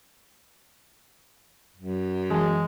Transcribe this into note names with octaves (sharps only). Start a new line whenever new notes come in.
F#2
E3 G#3 G#4 A5